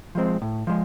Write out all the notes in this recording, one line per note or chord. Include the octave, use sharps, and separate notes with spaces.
F3 G#3 C4
A2
F3 G#3